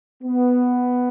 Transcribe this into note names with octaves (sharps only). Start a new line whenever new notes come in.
B3